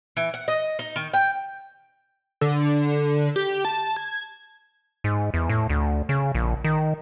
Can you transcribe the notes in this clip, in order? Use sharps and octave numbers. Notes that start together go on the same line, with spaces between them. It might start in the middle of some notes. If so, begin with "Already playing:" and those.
E3
F#5
D#5
D#4
D#3
G5
D3
G4
A5
G#6
G#2
E2
A2
D2
C#3
A#1
D#3